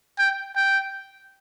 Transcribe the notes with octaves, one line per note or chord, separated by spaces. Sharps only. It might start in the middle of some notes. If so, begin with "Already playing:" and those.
G5
G5